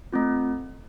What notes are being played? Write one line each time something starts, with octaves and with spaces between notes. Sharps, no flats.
A3 C4 F4